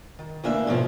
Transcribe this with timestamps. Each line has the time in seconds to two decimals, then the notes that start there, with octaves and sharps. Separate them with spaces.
0.19 D#3
0.44 D2 E3 A#3 D4 E5
0.67 G#2 B2 F3 C#4